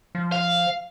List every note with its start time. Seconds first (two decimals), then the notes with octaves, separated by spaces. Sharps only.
0.15 F3
0.32 F5